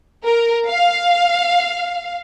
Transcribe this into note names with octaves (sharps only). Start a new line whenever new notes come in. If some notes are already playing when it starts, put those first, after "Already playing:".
A#4
F5